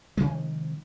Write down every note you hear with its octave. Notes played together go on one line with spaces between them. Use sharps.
C3 D#3 F3 G#3